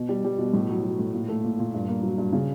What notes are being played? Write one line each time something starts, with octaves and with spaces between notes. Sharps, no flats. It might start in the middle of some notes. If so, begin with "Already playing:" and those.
Already playing: B2
G3
G3
B2
A2
F#3
F#3
A2
A#2
A3
A#2
A#2
G2
A#3
F#3
G2
C#3